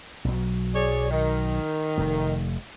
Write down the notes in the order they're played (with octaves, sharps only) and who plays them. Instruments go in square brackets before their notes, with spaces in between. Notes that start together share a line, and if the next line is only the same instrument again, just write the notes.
[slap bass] B1 F#3
[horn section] G#4 C#5 D5
D#3
[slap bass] F1 A3